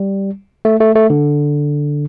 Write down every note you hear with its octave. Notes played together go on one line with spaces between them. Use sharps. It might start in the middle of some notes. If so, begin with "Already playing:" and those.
Already playing: G3
A3
A3
A3
D3